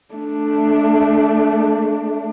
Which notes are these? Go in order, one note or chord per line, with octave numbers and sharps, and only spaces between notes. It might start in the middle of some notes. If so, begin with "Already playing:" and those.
A3 D4